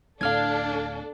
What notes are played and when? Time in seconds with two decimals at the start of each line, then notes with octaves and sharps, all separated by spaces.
0.21 D1 D4 A4 F5 F6 G#6